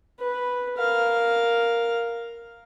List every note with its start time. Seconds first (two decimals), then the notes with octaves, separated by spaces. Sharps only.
0.19 B4
0.77 A#4 F5